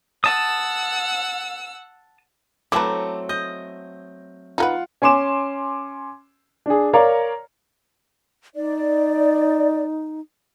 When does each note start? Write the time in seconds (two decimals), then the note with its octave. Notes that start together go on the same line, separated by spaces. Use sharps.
0.24 F#5 A5 D#6 E6
2.72 F#3 A3 C4 E4 B4 A5 A#5 D6
3.29 D#5 G6
4.58 D#4 F4 A#4 B4 F#5
5.02 C#4 G#5 C6 D6 E7
6.66 D4 G#4
6.93 A#4 C#5 D5 F5 A#5
8.55 D#4 D5